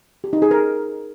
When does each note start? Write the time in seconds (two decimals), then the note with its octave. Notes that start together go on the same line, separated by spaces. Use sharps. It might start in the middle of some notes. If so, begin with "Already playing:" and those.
0.24 G4
0.33 D#4
0.42 G#4
0.51 A#4